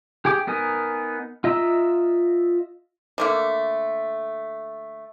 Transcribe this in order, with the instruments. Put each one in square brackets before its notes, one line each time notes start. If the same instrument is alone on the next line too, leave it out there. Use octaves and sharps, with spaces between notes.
[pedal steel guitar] G4 G#4 G5 D6
B3 D#4 A#4 G#5
F4 D#5 E5 A#5 E6
[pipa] D3 A3 A#3